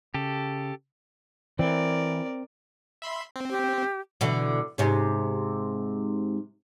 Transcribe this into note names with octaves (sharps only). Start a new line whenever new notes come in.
C#3 G4 A4
E3 C4 A#4 D5
E5 B5 C6
C4
G4
B2 D3 E3
G#2 C3 C#4